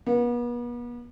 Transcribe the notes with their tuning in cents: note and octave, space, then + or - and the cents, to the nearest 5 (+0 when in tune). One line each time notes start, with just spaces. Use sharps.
B3 -40